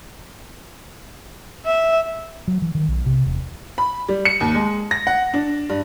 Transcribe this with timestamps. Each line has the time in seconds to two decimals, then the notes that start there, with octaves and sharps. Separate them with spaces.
1.66 E5
2.48 F#3
2.62 E3
2.75 D#3
2.88 B1
3.06 C3
3.26 E1
3.78 B5
4.08 G3
4.25 C#7
4.41 D#2
4.54 G#3
4.91 A#6
5.07 F#5
5.34 D4
5.69 G2